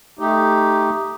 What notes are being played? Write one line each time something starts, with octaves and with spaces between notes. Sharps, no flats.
A3 D#4 G4